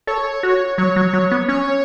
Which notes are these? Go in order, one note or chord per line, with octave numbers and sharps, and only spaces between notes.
A4 C#5
F#4
F#3 C#5
F#3
F#3
B3
C#4 C#5